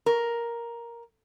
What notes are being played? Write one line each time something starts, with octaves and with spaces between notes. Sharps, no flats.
A#4